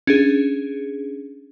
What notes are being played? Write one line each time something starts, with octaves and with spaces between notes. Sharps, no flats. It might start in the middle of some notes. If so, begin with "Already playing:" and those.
C#4 D4 G#4